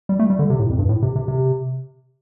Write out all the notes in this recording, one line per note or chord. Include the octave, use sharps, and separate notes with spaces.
G3
A3
G3
D3
C3
A2
F2
G2
A2
C3
C3
C3